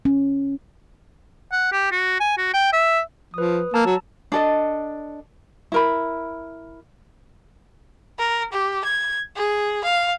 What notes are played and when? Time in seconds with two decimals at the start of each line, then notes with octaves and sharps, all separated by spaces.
0.05 C#4
1.52 F#5
1.72 G4
1.92 F#4
2.20 G#5
2.38 F#4
2.54 G5
2.73 E5
3.34 F3 B4 D#6
3.74 A#3 A5 A#5 E6
3.86 F#3
4.32 D4 A4 D#5
5.72 E4 A#4 B5
8.19 A#4
8.53 G4
8.84 G#6
9.36 G#4
9.84 F5